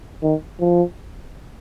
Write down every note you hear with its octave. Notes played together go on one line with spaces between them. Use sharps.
D#3
F3